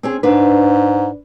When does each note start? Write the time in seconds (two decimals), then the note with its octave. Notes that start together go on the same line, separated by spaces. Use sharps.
0.03 C4 C#4 G#4
0.23 G#2 D4 B4